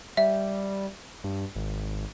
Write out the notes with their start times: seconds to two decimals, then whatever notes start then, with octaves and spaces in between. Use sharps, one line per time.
0.17 G3 E5
1.24 G2
1.56 G#1